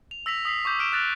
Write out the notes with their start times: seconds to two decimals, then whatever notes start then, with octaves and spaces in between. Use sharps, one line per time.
0.11 F7
0.26 E6 A#6 B6 F7
0.45 D#6 B6 C7
0.65 C#6 D6 G6
0.79 F6 D7 E7
0.93 F6 F#6 A6 A#6 D7 F7